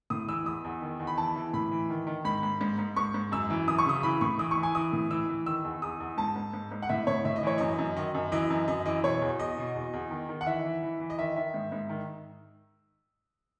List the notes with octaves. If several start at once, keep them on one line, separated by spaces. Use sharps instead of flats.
A2 D#6
E3 E6
E2 D#6
E2
D#3
E2
B5
E3 A5
E3
A2 B5
E3
D#3
D#3
G#2 B5
G#2
G#2
G#2
G#2 C#6
G#2
F#2 E6
E3
F#2 D#6
C#6
C#3 D#6
E3 B5
A2 C#6
E3 D#6
C#6
E3
G#5
E3 D#6
A2
E3 E6
E3
D#3 E6
E2
E2 D#6
E2
G#2 A5
G#2
G#2
G#2
F#5
A2 E5
A2 C#5
A2 E5
D#5
E3 C#5
F#2 D#5
F#2
D#3 D#5
F#2
E3 D#5
F#2
F#2 D#5
E3 D#5
B2 C#5
E2
E2 D#5
B2
E2
E2
D#3
D#3
F#5
E3 E5
E3
E3
E3
D#5
D#3 E5
D#3 E5
G#2
G#2
D#3